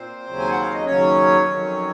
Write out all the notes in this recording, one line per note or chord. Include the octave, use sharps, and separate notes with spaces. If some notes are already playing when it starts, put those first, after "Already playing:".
Already playing: A#2 C4 C5
D#2 C#3 F#3
G#5
F#5
F5
D#5
D#2 C#3 F#3 C#4 C#5
F2 D#3 F#3